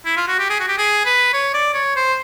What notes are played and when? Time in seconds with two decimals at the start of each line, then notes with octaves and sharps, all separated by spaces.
0.05 E4
0.17 F4
0.28 F#4
0.39 G4
0.50 G#4
0.60 F#4
0.68 G4
0.78 G#4
1.05 B4
1.33 C#5
1.54 D5
1.74 C#5
1.96 C5